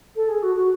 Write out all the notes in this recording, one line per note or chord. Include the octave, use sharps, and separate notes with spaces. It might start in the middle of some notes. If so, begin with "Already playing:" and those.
A4
G#4
F#4
F#4